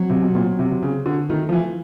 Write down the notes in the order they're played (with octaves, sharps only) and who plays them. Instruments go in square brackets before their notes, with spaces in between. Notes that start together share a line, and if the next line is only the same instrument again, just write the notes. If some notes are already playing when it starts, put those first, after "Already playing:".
Already playing: [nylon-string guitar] F#3 C4
[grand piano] C3
B2
[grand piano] A#2 [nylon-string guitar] C4
[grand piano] C3
C3
[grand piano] C#3 [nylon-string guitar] C4
[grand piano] D3
[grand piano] D#3 [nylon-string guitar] A3
[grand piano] F3
E3